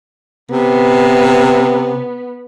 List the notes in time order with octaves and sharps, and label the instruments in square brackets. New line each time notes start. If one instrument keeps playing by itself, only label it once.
[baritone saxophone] C3 [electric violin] B3